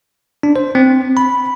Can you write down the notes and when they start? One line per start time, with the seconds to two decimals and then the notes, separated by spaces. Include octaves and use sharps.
0.43 D4
0.56 C5
0.75 C4
1.17 B5